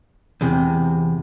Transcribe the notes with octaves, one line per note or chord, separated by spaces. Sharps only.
E2 C3